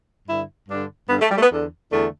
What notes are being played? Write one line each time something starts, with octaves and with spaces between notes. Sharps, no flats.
G2 D3 E4
G2 D3 D4
G2 D3 B3
A3
G3
A3
B3
E2 D3
E2 D3 A3